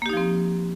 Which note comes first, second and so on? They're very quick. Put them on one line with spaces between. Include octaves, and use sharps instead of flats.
A#3 G4 D#4 F3 C4